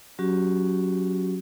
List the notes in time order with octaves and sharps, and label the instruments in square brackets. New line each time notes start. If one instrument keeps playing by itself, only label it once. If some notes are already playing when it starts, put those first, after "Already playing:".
[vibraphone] F#3 C#4 F#4 G4